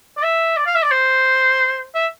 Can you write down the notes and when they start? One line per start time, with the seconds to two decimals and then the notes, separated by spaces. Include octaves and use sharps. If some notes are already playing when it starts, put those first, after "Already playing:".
0.18 D5
0.23 E5
0.57 D5
0.67 F5
0.75 E5
0.83 D5
0.92 C5
1.95 E5